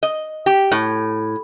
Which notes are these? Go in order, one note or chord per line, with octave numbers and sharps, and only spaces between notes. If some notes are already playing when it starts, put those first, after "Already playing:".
D#5
G4
A2